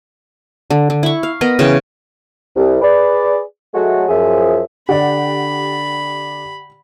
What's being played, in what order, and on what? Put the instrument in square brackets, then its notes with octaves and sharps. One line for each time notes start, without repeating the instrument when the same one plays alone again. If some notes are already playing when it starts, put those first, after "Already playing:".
[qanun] D3
D3
E4 C#6
F5
B3 A#4 D#5
C#3 E3 G5
[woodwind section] C2
G#4 B4 D5
F#3 G#3 A3 F#4
F#2 F3 G#4 E5
[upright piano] D3 D5 [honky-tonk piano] G4 F#5 [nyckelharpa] B5